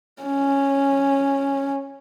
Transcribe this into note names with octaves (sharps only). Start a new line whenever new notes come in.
C#4